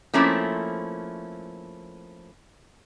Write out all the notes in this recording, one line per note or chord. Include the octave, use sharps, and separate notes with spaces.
F3 A3 A#3 C4 C#4 E4